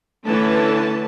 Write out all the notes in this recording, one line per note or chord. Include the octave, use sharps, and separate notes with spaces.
D3 E3 A3 C#4 B4 A5